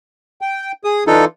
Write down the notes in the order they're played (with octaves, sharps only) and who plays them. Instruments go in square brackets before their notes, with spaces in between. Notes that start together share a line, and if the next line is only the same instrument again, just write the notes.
[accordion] G5
G#4 D#6
[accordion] E3 D4 F4 [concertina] D#4 A4